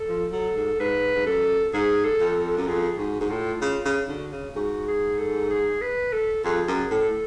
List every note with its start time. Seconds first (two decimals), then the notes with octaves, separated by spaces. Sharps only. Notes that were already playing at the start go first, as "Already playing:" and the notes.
Already playing: A4
0.09 F3
0.32 F#3 A4
0.56 G#2
0.80 G#2 B4
1.15 G#2
1.26 F#2 A4
1.73 G#2 G#4
2.05 A4
2.21 F2
2.36 A4
2.57 F#2
2.67 F2 G#4
2.99 G#2 F#4
3.21 G#2
3.30 A2 F4
3.62 C#3 F4
3.85 C#3 D4
4.08 D3 F#4
4.32 C#3
4.56 G#2 F#4
4.87 G#4
5.18 A4
5.50 G#4
5.81 B4
6.12 A4
6.45 F2 G#4
6.68 F#2
6.91 A2 A4